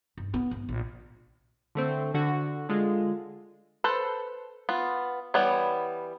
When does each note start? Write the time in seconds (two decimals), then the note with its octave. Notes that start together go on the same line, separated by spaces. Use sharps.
0.18 G2
0.34 B3
0.51 G#1
0.69 A#1
1.75 D3 A3 C4
2.14 D3 F#4
2.69 D3 G#3 F4
3.84 A4 B4 C5
4.69 B3 F4
5.34 E3 G3 B3 C#5